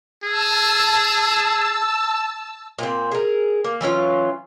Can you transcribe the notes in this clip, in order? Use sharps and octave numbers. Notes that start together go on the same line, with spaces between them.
G#4 A5 E6
A#2 C4
G#4 A#4
A#3
E3 F#3 C#4 F4